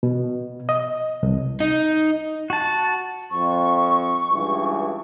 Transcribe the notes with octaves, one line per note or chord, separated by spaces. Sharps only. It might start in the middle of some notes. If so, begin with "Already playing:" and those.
B2
D#5
C2
D#4
F#4 A5
F2 C#6
C#2 G2 E3